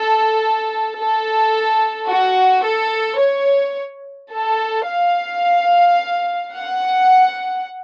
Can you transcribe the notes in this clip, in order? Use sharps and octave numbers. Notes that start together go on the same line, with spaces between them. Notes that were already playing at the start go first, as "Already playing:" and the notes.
Already playing: A4
A4
F#4
A4
C#5
A4
F5
F#5